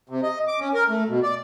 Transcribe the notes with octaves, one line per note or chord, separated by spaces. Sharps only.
C3
D#5
D6
C#4
A#4
A3
B2
D5